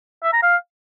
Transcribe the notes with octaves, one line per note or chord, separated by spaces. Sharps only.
E5
A#5
F5